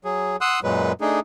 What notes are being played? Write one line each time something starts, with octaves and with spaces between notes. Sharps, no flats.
F#3 G#4
F#5 C6 D#6 E6 F#6
F#2 A#2 F#3 G#3 B4
A3 D4 D#4 G#4